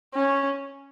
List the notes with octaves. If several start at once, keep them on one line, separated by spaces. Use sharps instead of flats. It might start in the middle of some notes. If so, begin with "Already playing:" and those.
C#4